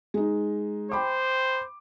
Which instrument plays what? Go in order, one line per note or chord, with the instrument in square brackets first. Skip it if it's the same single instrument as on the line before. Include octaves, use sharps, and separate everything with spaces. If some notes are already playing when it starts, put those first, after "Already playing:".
[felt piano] G#3 D#4
[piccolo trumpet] C5 [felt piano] G5 B5 D6